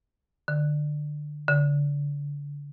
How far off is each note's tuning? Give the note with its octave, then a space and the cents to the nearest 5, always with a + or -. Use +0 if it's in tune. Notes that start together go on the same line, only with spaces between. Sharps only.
D3 +20
D3 -30